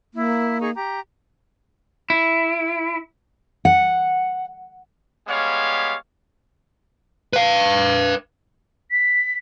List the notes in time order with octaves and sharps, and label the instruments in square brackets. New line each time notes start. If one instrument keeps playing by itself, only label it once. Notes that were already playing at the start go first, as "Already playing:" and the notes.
[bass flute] A#3 [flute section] E4
[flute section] D#4 G#4 C#6
G4 A#5
[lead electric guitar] E4
[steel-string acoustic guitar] F#5
[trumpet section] G3 G#3 B3 C#5 F5
[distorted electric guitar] B4 F5
[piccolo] B6